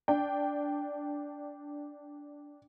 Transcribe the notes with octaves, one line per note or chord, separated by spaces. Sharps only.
D4 G5